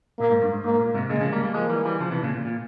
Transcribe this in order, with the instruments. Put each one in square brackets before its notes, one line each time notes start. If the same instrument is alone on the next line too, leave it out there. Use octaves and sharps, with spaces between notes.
[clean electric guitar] A#2 [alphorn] A#3
[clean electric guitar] G#2
G2
G#2
[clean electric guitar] G#2 [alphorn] A#3
[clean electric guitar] A#2
G#2 C3
[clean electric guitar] A#2 C#3 [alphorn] G#3
[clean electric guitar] C#3 F3
G3 A#3
G3 A#3
[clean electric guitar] F3 G#3 [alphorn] A#3
[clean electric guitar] E3 G3
E3 G3
C#3 F3
C3 E3
A#2 C#3
A#2
A#2